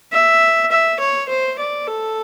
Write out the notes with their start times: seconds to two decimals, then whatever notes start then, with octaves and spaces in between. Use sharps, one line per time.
0.13 E5
0.71 E5
1.00 C#5
1.29 C5
1.59 D5
1.88 A4